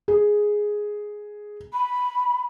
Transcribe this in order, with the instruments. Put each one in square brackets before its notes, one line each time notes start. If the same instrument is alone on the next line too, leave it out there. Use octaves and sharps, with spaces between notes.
[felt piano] G#4
[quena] B5